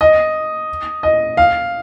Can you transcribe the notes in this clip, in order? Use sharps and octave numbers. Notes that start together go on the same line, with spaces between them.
D#5
D#5
F5